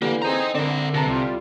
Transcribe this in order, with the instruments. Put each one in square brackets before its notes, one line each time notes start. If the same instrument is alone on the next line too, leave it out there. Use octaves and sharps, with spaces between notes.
[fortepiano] D3 E3 G4 [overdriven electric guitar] A#3
[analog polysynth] C4 G#4 C5 [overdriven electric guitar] D#5 A#5
[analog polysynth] D3 [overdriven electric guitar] C4 A#4 [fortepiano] D5
[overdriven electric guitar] C3 [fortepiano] A4 A5 A#5
[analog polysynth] C2 G3 F4